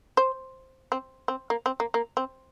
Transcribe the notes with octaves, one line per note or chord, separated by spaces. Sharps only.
C5
C4
C4
A#3
C4
A#3
A#3
C4